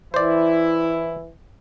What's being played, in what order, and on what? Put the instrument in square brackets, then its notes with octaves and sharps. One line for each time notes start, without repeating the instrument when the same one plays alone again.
[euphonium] E3 [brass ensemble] E4 [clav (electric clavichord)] C5 D5